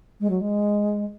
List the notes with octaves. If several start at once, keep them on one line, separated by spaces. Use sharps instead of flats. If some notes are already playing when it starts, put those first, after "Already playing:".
G#3
F#3
G#3